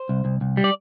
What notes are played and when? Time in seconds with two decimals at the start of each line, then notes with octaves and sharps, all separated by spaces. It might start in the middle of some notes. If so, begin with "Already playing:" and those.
Already playing: C5
0.09 C2
0.25 C2
0.41 C2
0.57 G3
0.64 D5